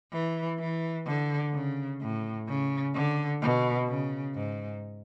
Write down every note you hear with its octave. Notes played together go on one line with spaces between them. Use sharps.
E3
E3
D3
C#3
A2
C#3
D3
B2
C#3
G#2